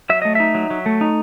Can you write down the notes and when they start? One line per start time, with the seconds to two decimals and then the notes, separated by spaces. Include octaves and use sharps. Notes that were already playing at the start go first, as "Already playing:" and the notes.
0.10 F#3 E5
0.22 A3 D#5
0.35 D#4 E5
0.54 F#3
0.70 F#3
0.86 A3
1.01 D#4